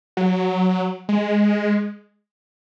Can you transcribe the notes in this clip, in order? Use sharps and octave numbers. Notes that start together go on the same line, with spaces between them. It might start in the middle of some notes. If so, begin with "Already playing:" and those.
F#3
G#3